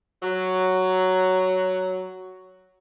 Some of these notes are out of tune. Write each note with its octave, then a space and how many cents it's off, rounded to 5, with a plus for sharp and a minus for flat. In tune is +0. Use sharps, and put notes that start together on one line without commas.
F#3 +5